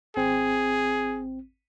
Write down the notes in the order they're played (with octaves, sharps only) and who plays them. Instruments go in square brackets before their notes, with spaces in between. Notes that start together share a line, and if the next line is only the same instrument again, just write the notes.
[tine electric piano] G#1 C4 [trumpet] G#4